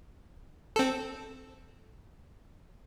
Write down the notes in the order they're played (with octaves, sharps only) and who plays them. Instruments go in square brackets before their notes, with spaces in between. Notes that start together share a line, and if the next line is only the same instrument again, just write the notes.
[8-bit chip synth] C4 A4